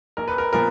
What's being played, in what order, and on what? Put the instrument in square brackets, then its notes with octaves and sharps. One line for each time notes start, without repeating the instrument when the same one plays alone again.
[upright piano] A#1 A#4
B4
A#4
A#2 F3 B3 A#4